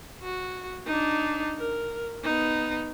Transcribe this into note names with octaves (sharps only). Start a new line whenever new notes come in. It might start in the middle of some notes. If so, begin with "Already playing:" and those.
F#4
D4 D#4
A#4
B3 D#4